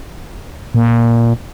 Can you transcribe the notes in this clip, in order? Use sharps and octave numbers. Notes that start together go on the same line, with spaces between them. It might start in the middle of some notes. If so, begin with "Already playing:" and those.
A#2